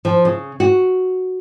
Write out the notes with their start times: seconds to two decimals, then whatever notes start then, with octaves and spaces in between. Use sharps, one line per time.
0.05 F3
0.25 C#3
0.60 F#4